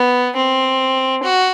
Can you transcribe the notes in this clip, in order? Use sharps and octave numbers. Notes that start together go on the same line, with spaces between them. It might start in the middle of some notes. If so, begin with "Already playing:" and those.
Already playing: B3
C4
F#4